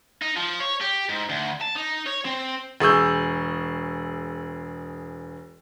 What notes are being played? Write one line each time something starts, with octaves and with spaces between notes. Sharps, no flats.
D#4
F3
C#5
G4
G#2
D2
A5
D#4
C#5
C4
E1 G#4 C#6 E6 G6